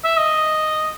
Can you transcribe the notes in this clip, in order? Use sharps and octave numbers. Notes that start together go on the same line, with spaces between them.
E5
D#5